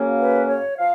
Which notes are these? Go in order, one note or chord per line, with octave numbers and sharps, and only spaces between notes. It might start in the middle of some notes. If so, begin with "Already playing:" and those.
Already playing: F#2 C#3 F#3 A#3 C#4
B4
C#5
F3 F5